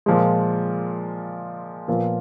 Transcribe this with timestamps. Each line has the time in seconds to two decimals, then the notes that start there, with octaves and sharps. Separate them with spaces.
0.06 A#2 F3 G#3
1.88 A#2 F3 B3 F4